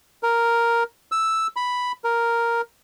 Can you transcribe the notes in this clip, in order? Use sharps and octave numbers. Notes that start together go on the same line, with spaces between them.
A#4
E6
B5
A#4